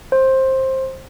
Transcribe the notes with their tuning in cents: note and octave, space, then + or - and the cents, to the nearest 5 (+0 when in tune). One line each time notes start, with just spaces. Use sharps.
C5 +15